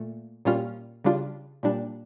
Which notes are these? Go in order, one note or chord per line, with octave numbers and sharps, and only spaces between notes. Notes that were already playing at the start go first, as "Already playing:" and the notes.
Already playing: A#2 A3
A#2 G3 C#4 F4
C#3 G3 D4 F4
A#2 G3 D4